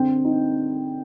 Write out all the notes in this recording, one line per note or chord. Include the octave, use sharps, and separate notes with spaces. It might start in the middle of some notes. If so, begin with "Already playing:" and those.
Already playing: D3 C4 G5
D#4